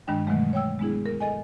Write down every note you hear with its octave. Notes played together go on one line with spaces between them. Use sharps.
G2 D#3 G#3 D4 G5
B2 D#3 E3 F#3 G#3 A3
C#5 G5 E6
G#3 B3 D4 E4 G#4
A#4
A4 D#5 G#5